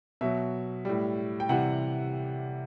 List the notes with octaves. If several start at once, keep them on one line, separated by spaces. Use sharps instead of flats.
B2 F#3 E5
A2 G3
G5
C3 E3 G3 F#5